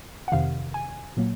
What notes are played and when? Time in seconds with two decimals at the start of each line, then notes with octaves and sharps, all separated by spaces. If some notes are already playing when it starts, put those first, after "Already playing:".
0.28 F#5
0.32 F2 C3 D#3 F5
0.74 G#5
1.17 A#2 F#3 A#3